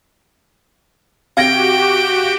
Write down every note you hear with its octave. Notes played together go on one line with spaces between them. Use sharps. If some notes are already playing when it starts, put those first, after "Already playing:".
C3 F#4 G4 F5 G5 G#6 A#6